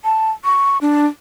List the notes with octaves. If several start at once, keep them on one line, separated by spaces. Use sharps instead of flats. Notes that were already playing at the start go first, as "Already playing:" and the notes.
A5
C#6
D4